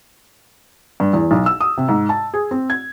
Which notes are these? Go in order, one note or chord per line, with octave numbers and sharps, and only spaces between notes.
G2
E2
B1
E6
D#6
C3
G#2
A5
G#4
C4
G#6